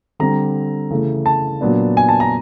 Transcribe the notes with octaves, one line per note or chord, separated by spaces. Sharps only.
D3 G3 C4 A#5
C#3 E3 A3
A5
A#2 F#3 B3 D4
G#5
A5
A#5